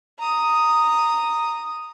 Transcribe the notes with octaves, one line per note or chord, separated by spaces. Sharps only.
A#5 D#6